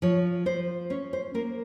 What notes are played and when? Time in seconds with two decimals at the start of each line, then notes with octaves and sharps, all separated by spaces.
0.02 F3 C#5
0.46 F3 C5
0.90 C#4 C#5
1.13 C5
1.34 A#3 A#4